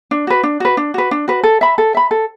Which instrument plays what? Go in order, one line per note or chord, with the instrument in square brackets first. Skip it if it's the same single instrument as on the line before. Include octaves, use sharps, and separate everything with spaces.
[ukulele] D4
F#4 B4
D4
F#4 B4
D4
F#4 B4
D4
F#4 B4
A4
E5 B5
A4
E5 B5
A4